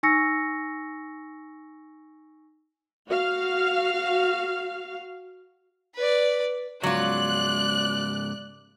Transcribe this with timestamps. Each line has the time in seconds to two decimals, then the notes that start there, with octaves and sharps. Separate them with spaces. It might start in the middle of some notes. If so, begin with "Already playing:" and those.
0.03 D#4 G#5 C#6 E6 A#6 C#7
3.08 F#4 F5
5.95 B4 D5
6.83 G#2 C#3 F#3 F4 D5 F#6